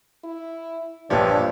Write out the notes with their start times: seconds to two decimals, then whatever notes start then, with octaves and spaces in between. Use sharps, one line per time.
0.24 E4
1.10 A#1 G2 A#2 F3 D4 G4 B4 C#5